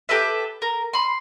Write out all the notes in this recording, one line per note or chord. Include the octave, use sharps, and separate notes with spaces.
G4 A4 B4 E5
A#4
B5 C6